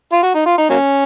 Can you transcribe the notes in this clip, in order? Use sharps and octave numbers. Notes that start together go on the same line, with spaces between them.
F4
F#4
D#4
F4
D#4
F#3 A#3 C#4